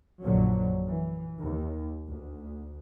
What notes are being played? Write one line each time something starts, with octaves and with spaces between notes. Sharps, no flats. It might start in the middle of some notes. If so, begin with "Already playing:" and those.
A#1 F#2 D3 F#3
E3
D#2
D2